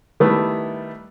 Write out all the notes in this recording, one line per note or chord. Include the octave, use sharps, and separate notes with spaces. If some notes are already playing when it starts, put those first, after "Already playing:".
D#3 G3 A3 B3 E4